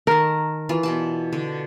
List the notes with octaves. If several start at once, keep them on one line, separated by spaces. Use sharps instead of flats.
D#3 A#4 A5
E3 F4
B2 D5 A5
D3